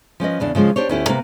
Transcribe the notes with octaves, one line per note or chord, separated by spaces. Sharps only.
F3 C#4 B4 D#5
E2 C#3 D4
C#3 F3 G#3 C#4 F4
D4 G4 C5 C#5
D2 C#4 E4 G4
C3 A#3 B4